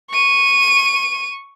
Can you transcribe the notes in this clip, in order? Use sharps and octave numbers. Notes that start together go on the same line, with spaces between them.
C#6 D#7